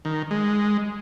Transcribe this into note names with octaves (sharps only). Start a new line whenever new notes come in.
D#3
G#3